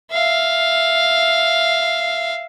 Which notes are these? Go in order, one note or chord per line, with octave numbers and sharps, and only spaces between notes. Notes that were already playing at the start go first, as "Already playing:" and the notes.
E5 F5